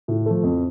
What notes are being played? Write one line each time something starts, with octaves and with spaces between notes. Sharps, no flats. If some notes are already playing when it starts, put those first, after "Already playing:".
A2
F3 A3
F2